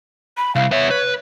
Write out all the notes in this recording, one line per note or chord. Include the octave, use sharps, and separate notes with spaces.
B5
C2 F5
B3 C#5 E5
B4